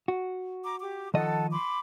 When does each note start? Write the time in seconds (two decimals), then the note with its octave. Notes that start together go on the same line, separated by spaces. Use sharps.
0.08 F#4
0.65 A#5 D6
0.80 G4 D6
1.14 D#3 F3 A4 D#5 F#5 A5
1.51 B5 C6 D6